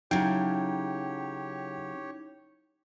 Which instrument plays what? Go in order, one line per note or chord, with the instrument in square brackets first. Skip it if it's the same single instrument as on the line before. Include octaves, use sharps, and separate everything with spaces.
[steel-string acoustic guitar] C#3 F#3 [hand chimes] D#4 E4 [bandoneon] G4 C#5 [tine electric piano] G5